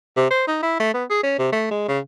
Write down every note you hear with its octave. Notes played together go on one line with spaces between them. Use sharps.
C3
C5
D#4
E4
A3
B3
G#4
C#4
C3
A3
G#3
C#3